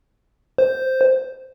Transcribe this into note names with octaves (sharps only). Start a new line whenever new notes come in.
C5